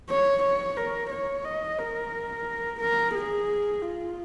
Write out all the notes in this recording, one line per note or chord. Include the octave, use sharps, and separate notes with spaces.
C#5
C#5
A#4
C#5
D#5
A#4
A#4
G#4
F4